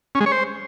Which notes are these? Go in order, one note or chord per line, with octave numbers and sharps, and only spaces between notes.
C#4
G#3
C#5
C5